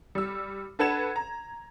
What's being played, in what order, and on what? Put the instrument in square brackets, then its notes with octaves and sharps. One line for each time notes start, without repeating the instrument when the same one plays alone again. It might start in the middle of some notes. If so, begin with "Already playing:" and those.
[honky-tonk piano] G3 E6
D4 A4 B4 F#5 G#6 E7
A#5